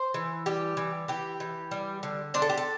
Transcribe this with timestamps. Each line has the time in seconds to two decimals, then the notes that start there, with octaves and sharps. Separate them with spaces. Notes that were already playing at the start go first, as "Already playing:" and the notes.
Already playing: C5
0.14 E3
0.46 G3 G4
0.77 E3
1.08 E3 G4
1.40 E3
1.71 G3
2.03 D3
2.34 D4 C5
2.42 A4
2.49 G4
2.57 A4